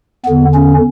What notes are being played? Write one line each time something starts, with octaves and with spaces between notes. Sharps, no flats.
E2 D3 B3
C#4